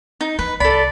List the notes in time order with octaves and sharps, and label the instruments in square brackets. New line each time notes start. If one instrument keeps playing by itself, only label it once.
[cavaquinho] D#4
[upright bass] E3 [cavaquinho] B4
[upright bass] C2 [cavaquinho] A4 B5 [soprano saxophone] D5